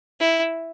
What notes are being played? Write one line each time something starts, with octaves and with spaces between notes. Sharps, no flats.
E4